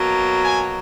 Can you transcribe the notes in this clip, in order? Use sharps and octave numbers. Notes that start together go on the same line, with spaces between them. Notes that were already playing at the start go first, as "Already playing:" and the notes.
Already playing: B2 F#3 A#3
G#5